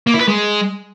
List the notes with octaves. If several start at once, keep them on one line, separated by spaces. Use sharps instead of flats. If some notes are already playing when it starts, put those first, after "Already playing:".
A#3
E4
B4
G#3